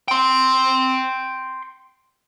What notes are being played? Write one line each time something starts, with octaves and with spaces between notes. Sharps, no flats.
G5 C6